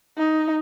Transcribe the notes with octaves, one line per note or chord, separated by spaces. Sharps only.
D#4